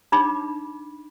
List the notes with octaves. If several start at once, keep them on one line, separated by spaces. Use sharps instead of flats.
D4 D#4 B5 D6